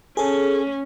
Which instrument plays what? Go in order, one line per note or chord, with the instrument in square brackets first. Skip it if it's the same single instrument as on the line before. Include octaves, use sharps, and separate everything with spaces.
[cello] C#4 [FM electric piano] G#4 A4